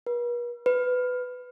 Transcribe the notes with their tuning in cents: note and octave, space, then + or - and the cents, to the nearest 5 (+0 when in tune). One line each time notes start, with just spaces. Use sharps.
B4 -45
B4 +15